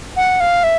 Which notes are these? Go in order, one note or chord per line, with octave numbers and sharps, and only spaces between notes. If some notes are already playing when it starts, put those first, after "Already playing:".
F#5
F5
E5